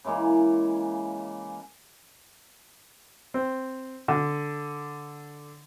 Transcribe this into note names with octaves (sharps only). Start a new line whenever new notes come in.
C#3 E3 G#3 A#3
C4
D3